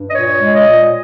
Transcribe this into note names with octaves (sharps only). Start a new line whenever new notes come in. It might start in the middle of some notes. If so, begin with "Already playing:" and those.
Already playing: G2
D#5
A#2 C#5
G#3
D#5
A#2